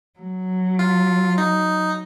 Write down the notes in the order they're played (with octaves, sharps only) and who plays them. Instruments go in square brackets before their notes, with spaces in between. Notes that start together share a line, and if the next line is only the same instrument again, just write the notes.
[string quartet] F#3
[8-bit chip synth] F4
D#4